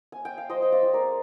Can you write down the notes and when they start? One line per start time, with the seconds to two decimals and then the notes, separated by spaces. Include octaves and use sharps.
0.12 G#5
0.25 G5
0.38 F5
0.50 F3 C5 D#5
0.62 G5
0.72 D5 F5
0.83 G#3 C4 F4
0.94 A#4 D5